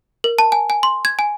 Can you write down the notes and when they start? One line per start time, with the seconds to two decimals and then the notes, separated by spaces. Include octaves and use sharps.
0.24 A#4
0.39 A5
0.52 G#5
0.70 G#5
0.83 C6
1.05 G#6
1.19 G#5